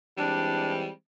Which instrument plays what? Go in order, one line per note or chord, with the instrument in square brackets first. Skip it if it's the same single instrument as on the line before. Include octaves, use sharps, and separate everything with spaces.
[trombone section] E3 G#3 C4 [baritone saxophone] G3 [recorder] D4